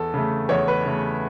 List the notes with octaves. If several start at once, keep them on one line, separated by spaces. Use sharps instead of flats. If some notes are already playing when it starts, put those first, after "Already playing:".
Already playing: E2 A4
C#3 A3
E2 C#5
B4
C#3 A3